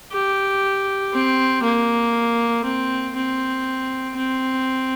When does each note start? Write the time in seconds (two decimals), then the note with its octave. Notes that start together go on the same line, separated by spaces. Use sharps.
0.12 G4
1.13 C4
1.63 A#3
2.64 C4
3.15 C4
4.16 C4